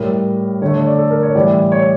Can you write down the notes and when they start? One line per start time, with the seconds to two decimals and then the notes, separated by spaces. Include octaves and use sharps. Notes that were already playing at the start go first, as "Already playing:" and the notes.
Already playing: A2 G3 A#4
0.62 D3 C#5
0.66 A3
0.74 C#5
0.86 D5
0.99 A4
1.10 A#4
1.23 C#5
1.35 A2 E3 G3 D5
1.72 C#5